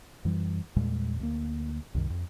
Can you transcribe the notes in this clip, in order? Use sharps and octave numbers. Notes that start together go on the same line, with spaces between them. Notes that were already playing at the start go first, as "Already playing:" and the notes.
F#2 E3 G3
E2 A#2 G3 G#3
D2 G#3 A#3
C2 F#2 C3 D#3
F2